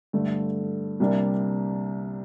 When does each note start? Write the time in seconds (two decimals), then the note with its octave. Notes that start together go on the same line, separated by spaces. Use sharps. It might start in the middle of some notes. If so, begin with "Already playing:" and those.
0.13 G2 D3 A3
1.00 C2 C3 G3 A#3 D4